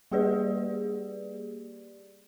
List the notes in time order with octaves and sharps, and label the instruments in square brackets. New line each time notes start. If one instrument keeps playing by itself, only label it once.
[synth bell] G3 A#3 G4 G#4 B4 D5